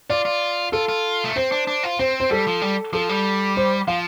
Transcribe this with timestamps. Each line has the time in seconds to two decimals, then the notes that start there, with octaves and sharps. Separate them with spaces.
0.10 F4 D5
0.25 F4
0.72 F4 A4
0.89 F4
1.24 A3
1.36 C4 C5
1.52 D4
1.67 D4
1.83 F4
1.99 C4 C5
2.20 C5
2.30 G3 A4
2.47 F3
2.62 G3
2.93 F3 A4
3.09 G3
3.57 C5
3.88 F3 F5